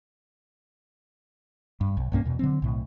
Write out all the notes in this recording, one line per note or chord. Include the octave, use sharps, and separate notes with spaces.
G2
B1
B1 G2 A#3 C#4
E2 B2
D3 F#3 C4
B1 A2